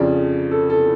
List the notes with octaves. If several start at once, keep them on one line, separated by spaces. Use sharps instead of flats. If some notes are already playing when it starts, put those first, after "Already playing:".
Already playing: F2 C#3 F3 D5
A4
A4